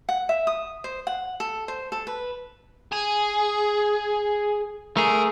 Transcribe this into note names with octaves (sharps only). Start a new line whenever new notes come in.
F#5
E5
D#6
C5
F#5
A4
C5
A4
B4
G#4
A3 G#4 A#4